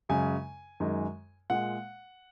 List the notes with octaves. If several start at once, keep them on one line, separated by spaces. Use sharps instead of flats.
F#2 C#3 G#3 G#5
F#2 D#3 G#3
A#2 G#3 F#5